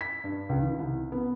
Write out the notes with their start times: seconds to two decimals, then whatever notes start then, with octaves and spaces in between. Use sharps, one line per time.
0.01 B6
0.24 G2
0.49 C#2
0.62 D#3
0.79 C2
1.12 B3